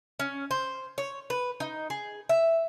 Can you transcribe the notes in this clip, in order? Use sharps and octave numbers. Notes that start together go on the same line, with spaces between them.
C#4
C5
C#5
B4
D#4
G#4
E5